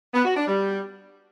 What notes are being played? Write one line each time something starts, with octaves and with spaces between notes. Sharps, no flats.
B3
F#4
D4
G3